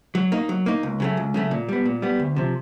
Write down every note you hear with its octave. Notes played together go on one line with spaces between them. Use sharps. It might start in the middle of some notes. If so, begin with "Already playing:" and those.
F#3
A#3 D#4
F#3
A#3 D#4
C#2
C#3 F#3 A3
C#2
C#3 F#3 A3
A#2
G3 B3
A#2
G3 B3
D2
C3 F3